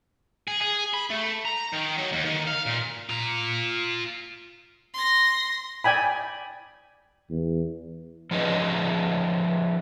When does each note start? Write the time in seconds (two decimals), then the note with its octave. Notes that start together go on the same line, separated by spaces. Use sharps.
0.48 G#4
0.61 G#4
0.94 B5
1.10 A3
1.45 A#5
1.73 D#3
1.98 F#3
2.12 D#2
2.25 D#3
2.47 F5
2.66 A#2
3.10 F4 A#5
4.94 C6 A#6
5.84 D5 G5 G#5 B5
7.30 E2
8.31 F3 C#4 D#4 G#4 B4 D#5